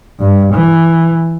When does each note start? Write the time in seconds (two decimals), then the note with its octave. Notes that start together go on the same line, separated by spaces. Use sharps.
0.19 G2
0.53 E3